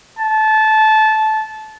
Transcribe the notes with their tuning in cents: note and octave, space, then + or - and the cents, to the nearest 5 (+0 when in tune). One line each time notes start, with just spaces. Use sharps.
A5 -20